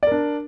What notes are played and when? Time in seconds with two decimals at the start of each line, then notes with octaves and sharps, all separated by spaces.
0.03 D5
0.07 A#4
0.12 D4